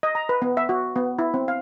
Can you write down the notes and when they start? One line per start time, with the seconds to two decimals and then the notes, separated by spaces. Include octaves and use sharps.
0.03 D#5
0.15 A#5
0.29 B4
0.42 B3
0.57 E5
0.69 F#4
0.96 B3
1.19 E4
1.34 C4
1.48 F5